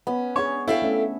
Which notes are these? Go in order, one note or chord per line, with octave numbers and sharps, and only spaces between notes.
B3 C#4
D4 G#4 C#5
D4 E4 A4 C#5 F5 G5
A3 C#4 E5